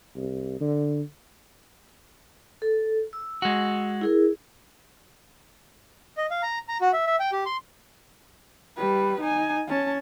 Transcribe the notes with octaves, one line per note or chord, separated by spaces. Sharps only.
C2
D3
A4
E6
G#3 F#4
E4 G#4 A#4
D#5
F5
A#5
A#5
F#4
E5
E5
G5
G4
C6
G3 B4
D#4 G#5
C#4 A5